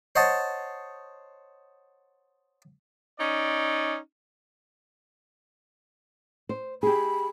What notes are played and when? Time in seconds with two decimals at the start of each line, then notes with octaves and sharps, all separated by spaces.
0.16 C5 C#5 D#5 F#5 A5
3.18 C#4 D#4 D5
6.49 C5
6.83 G4 G#4 B5